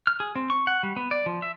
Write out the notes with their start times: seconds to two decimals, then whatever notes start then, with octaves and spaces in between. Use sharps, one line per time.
0.07 F6
0.20 G#4
0.36 C4
0.50 C#6
0.67 F#5
0.83 G3
0.96 B3
1.11 D5
1.26 F3
1.42 E5